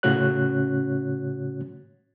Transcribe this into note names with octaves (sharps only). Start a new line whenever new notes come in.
A2 C#3 C#4 F#4 C#5 F#6